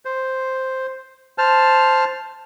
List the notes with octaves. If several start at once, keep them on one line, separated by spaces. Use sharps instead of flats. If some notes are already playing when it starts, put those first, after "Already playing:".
C5
C5 A5 F6